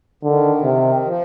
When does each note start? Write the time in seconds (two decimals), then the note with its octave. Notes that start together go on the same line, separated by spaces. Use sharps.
0.23 D3 D#3
0.64 C3
1.05 F3